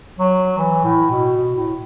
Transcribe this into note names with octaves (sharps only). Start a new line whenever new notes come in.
F#3
E3
A2
B2
B2
A2